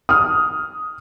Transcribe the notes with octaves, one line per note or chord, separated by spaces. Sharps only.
D#6 F6